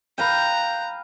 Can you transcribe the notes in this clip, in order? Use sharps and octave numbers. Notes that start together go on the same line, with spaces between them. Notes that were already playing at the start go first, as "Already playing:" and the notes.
B4 F5 G5 A#5